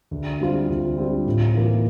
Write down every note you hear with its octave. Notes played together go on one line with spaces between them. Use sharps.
D2
D3 G3 C4 F4
D2
D3 G3 C4 F4
A2
E3 A#3 F4